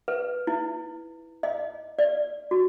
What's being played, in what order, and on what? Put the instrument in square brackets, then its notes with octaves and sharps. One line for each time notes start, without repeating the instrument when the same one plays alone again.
[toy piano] B4
E4
D#5
D5
F#4